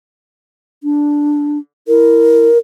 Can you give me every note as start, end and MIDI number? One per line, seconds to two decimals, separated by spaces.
0.83 1.58 62
1.88 2.49 64
1.88 2.58 70